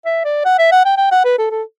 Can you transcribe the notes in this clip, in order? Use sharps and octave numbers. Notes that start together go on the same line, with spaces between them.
E5
D5
F#5
E5
F#5
G5
G5
F#5
B4
A4
A4